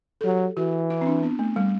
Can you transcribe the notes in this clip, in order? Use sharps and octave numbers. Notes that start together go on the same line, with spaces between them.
A4
F#3 G4
E3 F#4
E4
C4
D4
B3
A3
G3